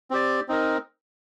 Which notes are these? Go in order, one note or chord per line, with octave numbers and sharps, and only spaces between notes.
C4 G4 D5
C4 D#4 A#4